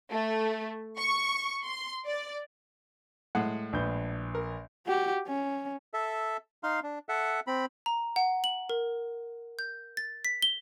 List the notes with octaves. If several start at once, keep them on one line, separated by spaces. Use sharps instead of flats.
A3
C#6
C6
D5
A2 G#3 F#5
A#1 B4 G6
A#4
F#4 G4
C#4
A4 E5
D#4 F5 C6
D4
A4 E5 F#5
C4 B5
A#5
F#5
F#7
A#4
G6
A6
B6
G7